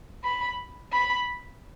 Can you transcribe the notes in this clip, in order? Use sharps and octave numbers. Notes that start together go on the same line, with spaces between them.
B5
B5